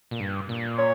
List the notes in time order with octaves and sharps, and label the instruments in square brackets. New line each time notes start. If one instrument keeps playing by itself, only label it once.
[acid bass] A#2
G2
A#2
[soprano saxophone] C#5